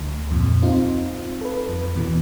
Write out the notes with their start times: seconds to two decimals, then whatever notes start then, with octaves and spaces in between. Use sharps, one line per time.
0.01 D2
0.31 F2 A#2
0.62 C4 D#4 F4
1.41 A4 B4
1.69 F2
1.96 E2 B2 E3